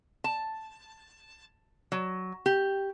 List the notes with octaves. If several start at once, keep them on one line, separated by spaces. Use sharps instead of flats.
A5
F#3
G4